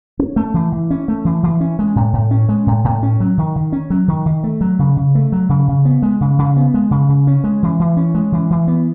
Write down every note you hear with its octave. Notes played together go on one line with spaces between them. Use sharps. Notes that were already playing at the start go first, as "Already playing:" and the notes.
C#4
A3
E3
E3
C#4
A3
E3
E3
C#4
G#3
A2
A2
C#4
G#3
A2
A2
C#4
F#3
D#3
D#3
C#4
F#3
D#3
D#3
A3
F#3
C#3
C#3
A3
F#3
C#3
C#3
B3
G#3
C#3
C#3
B3
G#3
C#3
C#3
C#4
G#3
E3
E3
C#4
G#3
E3
E3
B3